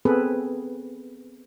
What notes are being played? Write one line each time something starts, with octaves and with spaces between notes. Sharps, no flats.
B3 C4 G#4 A4 B4